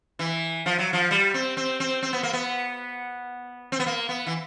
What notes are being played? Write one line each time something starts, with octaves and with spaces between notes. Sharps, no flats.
E3
F3
F#3
F3
G3
C4
C4
C4
C4
B3
A#3
B3
C4
B3
A#3
B3
E3